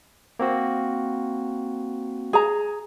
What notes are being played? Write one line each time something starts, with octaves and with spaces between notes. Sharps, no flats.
A#3 C4 F#4
G#4 A#5